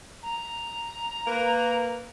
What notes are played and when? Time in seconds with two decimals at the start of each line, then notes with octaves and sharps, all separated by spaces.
0.23 A#5
1.27 A#3 B4